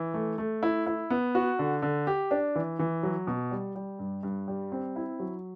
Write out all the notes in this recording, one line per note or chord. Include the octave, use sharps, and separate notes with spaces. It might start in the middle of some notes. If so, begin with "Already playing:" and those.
Already playing: E3
A3
A3
E4
E4
B3
F#4
D3
D3
G4
D4
E3
E3
F#3
B2
G3
G3
G2
G2
G3
C4
E4
F#3